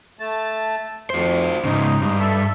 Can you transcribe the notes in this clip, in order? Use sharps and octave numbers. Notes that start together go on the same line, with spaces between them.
A3 A5
F2 F#4 C5
G#2 C#3 D#4
G2
A4 E5